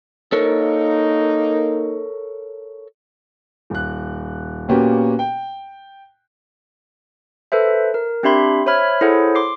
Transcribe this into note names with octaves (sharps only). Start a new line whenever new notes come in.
A#3 D#4 A4 A#4 C#5
D#1 F#6
A#2 A#3 B3 C#4 F#4 G4
G5
A4 B4 C5 E5
A#4
C4 D4 G4 E5 B5 C6
C5 C#5 E5 B5 F6 G#6
E4 G#4 A4 C5 C#5 F#5
C6 D6 C7